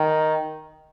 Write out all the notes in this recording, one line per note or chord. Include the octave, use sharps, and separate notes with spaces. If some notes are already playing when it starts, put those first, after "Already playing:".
Already playing: D#3